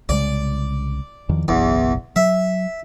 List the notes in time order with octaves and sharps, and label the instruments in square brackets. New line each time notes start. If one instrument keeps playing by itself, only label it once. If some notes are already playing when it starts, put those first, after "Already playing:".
[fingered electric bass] C2 C#3 G#3 [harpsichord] D5
[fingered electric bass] E2 D#3 F3
[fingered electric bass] F#1 B1 [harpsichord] E2
[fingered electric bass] F#3 [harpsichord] E5